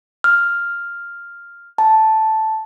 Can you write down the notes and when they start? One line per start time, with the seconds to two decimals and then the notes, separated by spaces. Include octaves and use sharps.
0.24 F6
1.78 A5